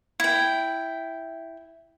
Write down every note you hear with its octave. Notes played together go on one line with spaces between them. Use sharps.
E4 G5